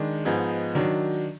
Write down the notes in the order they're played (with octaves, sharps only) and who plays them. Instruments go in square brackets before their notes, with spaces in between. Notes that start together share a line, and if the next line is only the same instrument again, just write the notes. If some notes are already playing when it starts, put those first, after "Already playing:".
Already playing: [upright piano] D#3 G#3 D4
G#2 F3 B3 D#4 G#4
D#3 F#3 D4